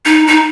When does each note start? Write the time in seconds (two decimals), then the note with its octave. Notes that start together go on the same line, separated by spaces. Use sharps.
0.05 D#4
0.27 D#4